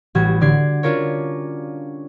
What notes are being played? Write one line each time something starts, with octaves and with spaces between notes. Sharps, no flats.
A1 E3 G3 F#4 G#6
D3 D5 G#6 C7
C#4 D4 F4 A#4 C#5